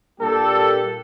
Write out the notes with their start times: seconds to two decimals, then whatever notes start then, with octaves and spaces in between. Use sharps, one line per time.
0.19 A#2 G3 A#3 D4 G4 A4